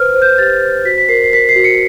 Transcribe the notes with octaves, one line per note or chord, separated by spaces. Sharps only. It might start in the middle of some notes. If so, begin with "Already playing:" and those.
Already playing: B4 C5 F6
C5
G6
G4 A6
C5
F#4 B6
B6
A#4 C7
C7
A#4 B6
C7
F#4
C#7